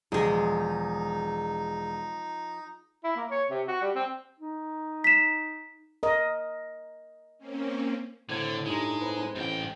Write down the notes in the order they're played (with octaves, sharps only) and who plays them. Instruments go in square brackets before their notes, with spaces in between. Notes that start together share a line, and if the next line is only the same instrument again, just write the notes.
[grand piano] E1 [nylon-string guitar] F3 [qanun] G#3 G#4 [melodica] D#4
[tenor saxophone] E4
A#3
C#5
C3
F#4
G3
C4
[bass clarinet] D#4
[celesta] B6 E7
[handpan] A#4 D#5
[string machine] A#3 C4 C#4
[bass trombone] A2 [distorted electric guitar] D3 [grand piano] C4 G#6 F#7
[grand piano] G2 [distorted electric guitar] G#3 [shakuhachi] D#4
[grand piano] C4 B4
[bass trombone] A1 [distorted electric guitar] G#2 G5